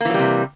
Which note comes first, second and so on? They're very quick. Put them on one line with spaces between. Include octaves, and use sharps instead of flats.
A#3 E3 F#3 G3 C3